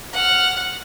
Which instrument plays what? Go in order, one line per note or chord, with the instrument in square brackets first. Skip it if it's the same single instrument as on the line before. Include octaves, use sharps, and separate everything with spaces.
[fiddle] F#5 F6